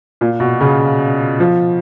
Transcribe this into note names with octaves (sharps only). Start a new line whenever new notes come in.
A#2
B2
C#3
F3